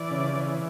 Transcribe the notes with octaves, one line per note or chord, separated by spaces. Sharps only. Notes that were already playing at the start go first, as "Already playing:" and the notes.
Already playing: E3 D5
C#3
E3